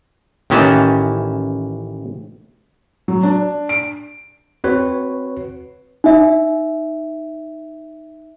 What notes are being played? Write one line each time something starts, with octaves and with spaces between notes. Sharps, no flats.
A1 D#3 E3 C#4 A5
F#3
D4
D7
C4 F#4 B4 C#5
D#4 E5